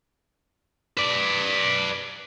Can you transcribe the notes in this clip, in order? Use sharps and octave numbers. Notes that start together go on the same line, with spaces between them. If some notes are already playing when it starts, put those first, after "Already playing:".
B4 D5